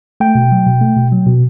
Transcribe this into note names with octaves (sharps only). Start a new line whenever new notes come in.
A3 G5
B2
F#3
B2
A3
B2
F#3
B2